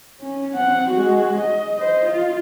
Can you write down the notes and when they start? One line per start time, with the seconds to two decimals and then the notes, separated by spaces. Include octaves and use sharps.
0.21 C#4
0.55 C4 F#5
0.91 G#3 F#4
1.41 D#5
1.76 C5 D#5
2.06 F4